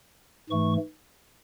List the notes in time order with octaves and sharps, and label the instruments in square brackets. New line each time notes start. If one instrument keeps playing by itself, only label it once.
[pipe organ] G#2 E3 A3 C#6